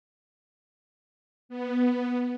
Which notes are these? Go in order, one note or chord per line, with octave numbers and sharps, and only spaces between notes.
B3